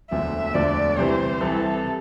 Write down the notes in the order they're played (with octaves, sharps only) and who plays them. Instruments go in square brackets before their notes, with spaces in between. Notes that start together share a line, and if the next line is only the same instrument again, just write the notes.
[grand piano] E1 D2 D3 F3 A3 [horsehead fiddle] E5
[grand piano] E1 D2 D3 F3 A3 [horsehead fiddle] D5
[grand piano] C2 C3 E3 [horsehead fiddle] C5
[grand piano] C2 C3 E3 [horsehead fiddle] A4
[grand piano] C3